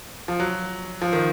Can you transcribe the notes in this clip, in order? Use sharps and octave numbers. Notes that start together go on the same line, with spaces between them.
F3
F#3
F3
D#3